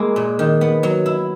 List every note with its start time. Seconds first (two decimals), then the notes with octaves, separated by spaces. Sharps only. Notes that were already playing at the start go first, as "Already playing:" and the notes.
Already playing: G#3 A#3 E4
0.16 A#2
0.39 D#3
0.61 B3
0.83 F#3
1.06 E4